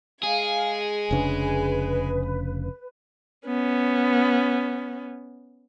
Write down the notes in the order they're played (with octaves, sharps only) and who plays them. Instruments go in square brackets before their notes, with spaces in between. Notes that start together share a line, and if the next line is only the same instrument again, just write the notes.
[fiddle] G#3 G#5 [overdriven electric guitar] G#4 [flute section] F5
[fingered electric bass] F1 C#3 D4 [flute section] B4
[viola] B3 C#4